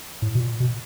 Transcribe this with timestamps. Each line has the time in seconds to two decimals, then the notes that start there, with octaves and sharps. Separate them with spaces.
0.22 A2
0.35 B2
0.40 A#2
0.60 B2